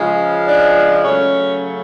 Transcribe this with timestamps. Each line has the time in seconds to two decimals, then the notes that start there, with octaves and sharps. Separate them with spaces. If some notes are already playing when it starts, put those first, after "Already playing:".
Already playing: C#3 F3 G#3 C#4
0.47 D4
1.03 C#3 F#3 A3 C#4